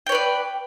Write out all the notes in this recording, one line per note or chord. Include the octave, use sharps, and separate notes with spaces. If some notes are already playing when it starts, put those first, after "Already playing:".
B4 C#5 D5 G5